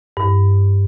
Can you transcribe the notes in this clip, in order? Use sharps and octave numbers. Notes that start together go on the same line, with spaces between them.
G2